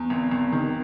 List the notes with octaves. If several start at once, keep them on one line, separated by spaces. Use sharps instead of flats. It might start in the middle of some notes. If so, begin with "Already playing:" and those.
Already playing: E2
G#1
G#1
D#3